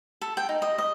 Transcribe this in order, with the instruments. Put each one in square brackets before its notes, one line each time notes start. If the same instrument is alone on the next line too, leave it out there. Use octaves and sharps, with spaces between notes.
[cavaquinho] A4
G5
D#4
D#5
D#5